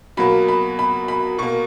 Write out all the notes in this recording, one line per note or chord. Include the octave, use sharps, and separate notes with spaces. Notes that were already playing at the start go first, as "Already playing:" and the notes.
B2 F#3 A#3 B5
B5
B5
B5
B2 A#3 C#6